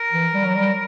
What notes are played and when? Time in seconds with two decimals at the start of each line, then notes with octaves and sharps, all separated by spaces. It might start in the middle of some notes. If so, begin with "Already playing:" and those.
Already playing: A#4
0.12 E3
0.34 G3
0.44 F#3
0.55 G3